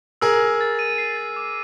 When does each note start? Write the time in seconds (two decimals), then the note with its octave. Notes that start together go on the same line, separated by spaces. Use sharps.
0.21 G#4 A#4 E6
0.41 E6
0.61 A6
0.79 D#7
0.98 C7
1.17 A6
1.36 D6